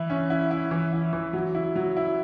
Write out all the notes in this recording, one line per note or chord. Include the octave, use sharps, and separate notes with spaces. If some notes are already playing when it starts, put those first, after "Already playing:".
Already playing: E3 E4
C#4
E4
E4
E3
E4
E3
F#3
E4
F#3
E4